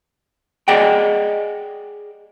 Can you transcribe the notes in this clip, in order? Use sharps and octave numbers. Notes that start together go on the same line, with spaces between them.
G#4 D5 D#5 F#5 G5